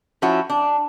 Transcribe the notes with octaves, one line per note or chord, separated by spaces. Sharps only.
F3 C#4 E4 F#4
D4